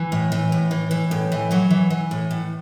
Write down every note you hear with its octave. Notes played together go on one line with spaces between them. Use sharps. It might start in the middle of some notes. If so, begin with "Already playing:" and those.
Already playing: E3
A2
E3
A2
E3
E3
A2
E3
E3 F#3
E3
E3
A2
A2